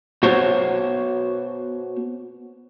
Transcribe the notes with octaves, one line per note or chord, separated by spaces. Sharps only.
B3 F#4 C5 C#5